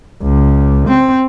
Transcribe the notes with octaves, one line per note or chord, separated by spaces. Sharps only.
C#2
C4